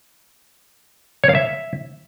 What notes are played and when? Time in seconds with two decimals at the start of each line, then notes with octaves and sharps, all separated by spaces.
1.24 C#5
1.29 F5
1.35 E5